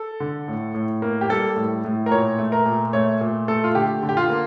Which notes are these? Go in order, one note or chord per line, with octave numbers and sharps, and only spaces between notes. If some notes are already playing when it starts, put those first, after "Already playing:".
Already playing: A4
D3
A2
A2
A#3
G4
G3 A4
A2
A2
A#4
A#2 C#5
A3
A#4
A#2
A3 C#5
A#2
A3 A4
F4
D3 G4
D3
G4
F4
A#3